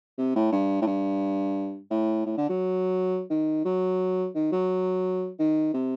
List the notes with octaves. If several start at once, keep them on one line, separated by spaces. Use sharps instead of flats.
C3
A2
G2
A2
G2
A2
A2
D3
F#3
D#3
F#3
D#3
F#3
D#3
C3